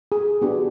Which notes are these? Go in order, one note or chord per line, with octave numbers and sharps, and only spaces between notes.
G#4
B3 D4 F#4 G4